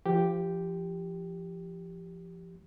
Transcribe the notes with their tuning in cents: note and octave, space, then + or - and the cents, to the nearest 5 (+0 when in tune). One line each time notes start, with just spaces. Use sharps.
F3 -30 G4 +0